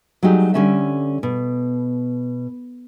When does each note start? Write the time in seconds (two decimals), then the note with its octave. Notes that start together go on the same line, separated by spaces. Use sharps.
0.23 F#3 G3 A3 D#4 G4 G#4
0.54 D3 G3 C#4 A4 E5
1.23 B2